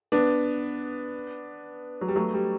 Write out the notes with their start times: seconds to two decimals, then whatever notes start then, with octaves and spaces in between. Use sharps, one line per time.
0.12 B3 D4
2.01 F#3
2.08 G3
2.16 F#3 A3
2.34 G3